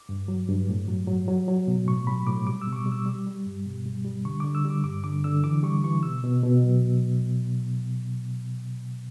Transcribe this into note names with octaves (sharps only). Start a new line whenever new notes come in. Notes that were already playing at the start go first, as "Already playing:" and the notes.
Already playing: D6
G2
F#3
G2
A2
F#3
F#3
F#3
F#3
B2
A2 C#6
F#3 B5
A2 D6
G3 D6
E6
B2
C#6
D6
G3
E6
G3
G3
G2
B2
G3
G3
D3 C#6
D3 D6
E6
G3
D6
G2 D6
D3 D6
D3 E6
E3 D6
G3 C#6
E3 C#6
B2 E6
B2
B2
F#3